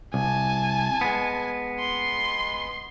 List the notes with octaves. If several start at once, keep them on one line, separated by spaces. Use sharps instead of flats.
C2 G#5 A5
G#3 B3
C6